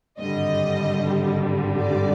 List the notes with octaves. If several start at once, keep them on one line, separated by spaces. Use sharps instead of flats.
G#1 G2 D3 G3 D#5
D5